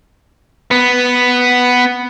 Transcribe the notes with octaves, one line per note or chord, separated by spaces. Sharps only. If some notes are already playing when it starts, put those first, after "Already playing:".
B3